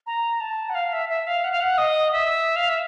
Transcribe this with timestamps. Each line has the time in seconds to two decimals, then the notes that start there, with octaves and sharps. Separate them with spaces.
0.07 A#5
0.41 A5
0.70 F#5
0.75 F5
0.93 E5
1.09 E5
1.27 F5
1.44 F#5
1.52 F5
1.61 F#5
1.78 D#5
2.12 E5
2.56 F5
2.69 E5